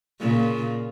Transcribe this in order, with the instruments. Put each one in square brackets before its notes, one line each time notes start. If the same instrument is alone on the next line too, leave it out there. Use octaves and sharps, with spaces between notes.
[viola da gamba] A#2 C#3